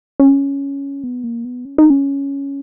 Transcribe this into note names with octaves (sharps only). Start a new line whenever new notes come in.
C#4
B3
A#3
B3
C#4
D#4
C#4